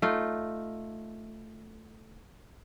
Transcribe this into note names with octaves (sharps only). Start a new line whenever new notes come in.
A3 D#4 F4